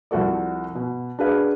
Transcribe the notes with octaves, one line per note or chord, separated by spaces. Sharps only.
C2 F3 F#4 A4 D5
B2
D4 F#4 G#4 B4 F5